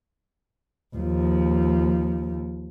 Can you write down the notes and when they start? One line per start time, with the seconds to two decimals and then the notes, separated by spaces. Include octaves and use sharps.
0.96 D#2 F3